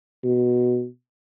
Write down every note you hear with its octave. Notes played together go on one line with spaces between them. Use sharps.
B2